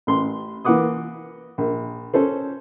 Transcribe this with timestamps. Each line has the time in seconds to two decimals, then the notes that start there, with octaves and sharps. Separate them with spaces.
0.07 A1 C6
0.65 E3 A#3 B4 F#5 D6 D#6
1.58 A#1
2.14 C#4 A4 C5